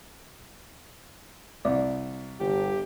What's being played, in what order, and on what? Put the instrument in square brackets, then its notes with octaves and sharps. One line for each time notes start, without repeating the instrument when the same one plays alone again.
[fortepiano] C2 [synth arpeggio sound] D5
[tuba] G1 [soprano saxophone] G4